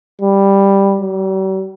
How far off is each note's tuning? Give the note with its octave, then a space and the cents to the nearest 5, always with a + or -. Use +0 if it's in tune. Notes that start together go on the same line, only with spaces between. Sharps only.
G3 +5
G3 -45